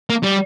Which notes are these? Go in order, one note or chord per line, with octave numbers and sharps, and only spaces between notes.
A#3
G3